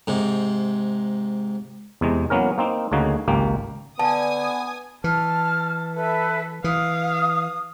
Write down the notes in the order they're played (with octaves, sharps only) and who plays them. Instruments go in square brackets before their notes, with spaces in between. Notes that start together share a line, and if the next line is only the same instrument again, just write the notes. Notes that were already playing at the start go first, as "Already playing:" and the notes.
[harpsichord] G#2 C3
[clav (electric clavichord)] E2 C3 G#3
E3 F#3 A#3 B3 C#4 A#4
A#3 C4 D#4
D2 C#3 A#3 D#4 F#4
G#1 C#2 A#3 G4
[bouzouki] D3 [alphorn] B3 [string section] G#5 D#6 [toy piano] A5
[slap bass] E3 [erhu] A5 [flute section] F6
[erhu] A4 [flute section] B4 E5
[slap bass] E3 [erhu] F5 [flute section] D#6